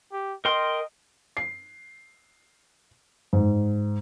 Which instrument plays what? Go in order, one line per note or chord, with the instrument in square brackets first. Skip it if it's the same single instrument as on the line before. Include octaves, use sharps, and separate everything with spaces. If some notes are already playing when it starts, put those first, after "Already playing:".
[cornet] G4
[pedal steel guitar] A#4 G5 C6 [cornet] D#5
[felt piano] C7
G#2